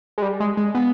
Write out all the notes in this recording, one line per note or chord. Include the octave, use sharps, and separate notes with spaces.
G#3
G3
G#3
G#3
B3